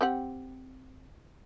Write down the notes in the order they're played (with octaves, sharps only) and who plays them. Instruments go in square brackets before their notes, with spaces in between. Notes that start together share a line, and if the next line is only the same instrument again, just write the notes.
[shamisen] C4 G4 F#5